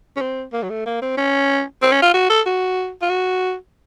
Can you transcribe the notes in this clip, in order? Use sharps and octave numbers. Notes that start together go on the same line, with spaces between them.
C#4
C4
A#3
F#3
A3
A#3
C4
C#4
C4
C#4
F4
F#4
A4
F#4
F4
F#4